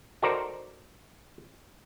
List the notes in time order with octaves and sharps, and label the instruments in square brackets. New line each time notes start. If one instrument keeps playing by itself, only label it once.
[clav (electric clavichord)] D#4 F#4 A4 A#4 C5 D5